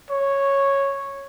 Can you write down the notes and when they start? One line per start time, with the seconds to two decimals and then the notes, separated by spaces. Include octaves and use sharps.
0.10 C#5